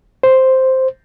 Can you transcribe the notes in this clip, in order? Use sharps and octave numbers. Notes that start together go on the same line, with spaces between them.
C5